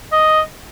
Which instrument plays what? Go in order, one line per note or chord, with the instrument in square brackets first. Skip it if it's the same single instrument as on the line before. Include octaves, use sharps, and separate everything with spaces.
[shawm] D#5